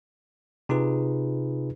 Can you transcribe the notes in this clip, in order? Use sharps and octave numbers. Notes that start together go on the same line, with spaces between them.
C3 D#4 F4 G#4 B4